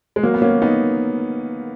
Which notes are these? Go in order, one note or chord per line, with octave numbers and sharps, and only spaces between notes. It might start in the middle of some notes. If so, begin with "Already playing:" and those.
G#3
F#3 A#3
B3
A#3 C#4
B3 D#4